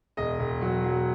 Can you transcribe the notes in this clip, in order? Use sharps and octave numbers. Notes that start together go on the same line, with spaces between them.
E1 D#5
E1
F#3
F#3